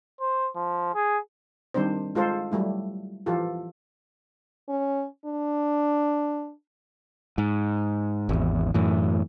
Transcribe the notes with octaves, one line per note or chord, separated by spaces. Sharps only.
C5
F3
G#4
D#3 G3 C4 D4 C5
G#3 F4 A4 C5
F#3 G3 A3 E4
E3 F3 F4 G4 A4
C#4
D4
G#2
G#1 E2
F#2 A2 E3